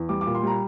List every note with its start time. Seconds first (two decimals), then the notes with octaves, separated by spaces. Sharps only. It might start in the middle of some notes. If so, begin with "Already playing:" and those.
Already playing: E2
0.09 G3 D6
0.21 A#2 D6
0.35 C6
0.43 G3 A#5